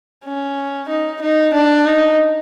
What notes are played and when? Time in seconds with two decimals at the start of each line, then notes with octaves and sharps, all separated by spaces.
0.25 C#4
0.89 D#4
1.21 D#4
1.54 D4
1.86 D#4